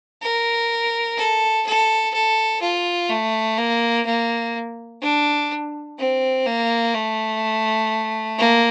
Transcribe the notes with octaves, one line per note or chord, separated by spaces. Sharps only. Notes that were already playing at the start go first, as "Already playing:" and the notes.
A#4
A4
A4
A4
F4
A3
A#3
A#3
D4
C4
A#3
A3
A#3